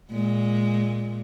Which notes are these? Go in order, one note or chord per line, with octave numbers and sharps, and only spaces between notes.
A#2 G#3